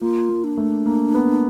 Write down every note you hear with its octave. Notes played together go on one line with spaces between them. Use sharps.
A#3 F4
A#3
D4
A3
A#3
B3